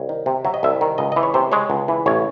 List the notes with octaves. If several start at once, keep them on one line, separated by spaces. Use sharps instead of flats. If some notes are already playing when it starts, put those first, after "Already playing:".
Already playing: C2 C#5
D#3
C3
F#3 E5
D#5
C2 E5
D#3
C#2 D#5
E3 D#5
C#5
C3 C5
G#3 C#5
C#2
E3
A1 C#5